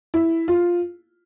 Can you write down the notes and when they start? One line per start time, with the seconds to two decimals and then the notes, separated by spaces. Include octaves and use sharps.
0.14 E4
0.48 F4